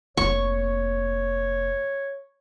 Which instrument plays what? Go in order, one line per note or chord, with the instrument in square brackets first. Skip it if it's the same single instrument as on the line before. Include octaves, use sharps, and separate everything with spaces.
[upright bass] F1 A#3 [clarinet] C#5 [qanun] C#6